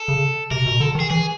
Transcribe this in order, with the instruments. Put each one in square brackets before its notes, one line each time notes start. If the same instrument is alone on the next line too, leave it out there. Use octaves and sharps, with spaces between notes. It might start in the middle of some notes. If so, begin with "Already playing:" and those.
Already playing: [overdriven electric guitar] A4
[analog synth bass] C#3
[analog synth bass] C3 [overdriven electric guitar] A#4
[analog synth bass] B2
[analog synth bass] D3 [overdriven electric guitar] A4
[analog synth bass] D#3
[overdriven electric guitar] G#4
[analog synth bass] E3 [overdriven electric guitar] G#4